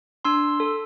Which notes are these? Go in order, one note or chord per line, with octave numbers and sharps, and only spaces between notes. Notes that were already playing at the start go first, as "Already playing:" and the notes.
D4 C6 E6
A4